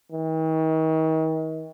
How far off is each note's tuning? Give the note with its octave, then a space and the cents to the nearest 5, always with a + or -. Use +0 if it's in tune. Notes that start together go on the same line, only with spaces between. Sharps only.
D#3 +40